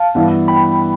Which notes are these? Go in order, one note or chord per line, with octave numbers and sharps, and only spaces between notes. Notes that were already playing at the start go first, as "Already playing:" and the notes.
Already playing: F5 A5
G2 E3 B3 E4
G5 B5